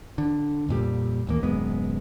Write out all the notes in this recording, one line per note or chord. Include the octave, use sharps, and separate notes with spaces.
D3
F2 A#2 G3
A1 D#2 A#3
D#1 F#2 G#3 B3